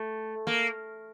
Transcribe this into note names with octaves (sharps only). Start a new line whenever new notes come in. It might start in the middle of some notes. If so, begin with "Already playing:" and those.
Already playing: A3
A#3